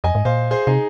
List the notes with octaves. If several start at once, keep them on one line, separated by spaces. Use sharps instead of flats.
F2 D#5 G#5
G#2
A#2 C5 F5
G#4 C5
C3 D#4 G#4